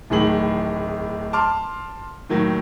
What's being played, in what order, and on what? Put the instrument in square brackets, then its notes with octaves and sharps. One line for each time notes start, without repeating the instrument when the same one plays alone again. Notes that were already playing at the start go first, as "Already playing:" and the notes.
[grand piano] D1 A2 D#3 G#4 F#7
A5 C6 D6 F6
A2 D#3 F#3 A#3